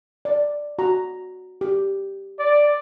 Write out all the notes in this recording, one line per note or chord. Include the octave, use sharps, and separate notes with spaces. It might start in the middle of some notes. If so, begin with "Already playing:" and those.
D5
F#4 A#5
G4
D5